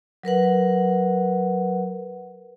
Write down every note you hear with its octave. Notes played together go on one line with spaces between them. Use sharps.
F#3 A#4 B4 F#5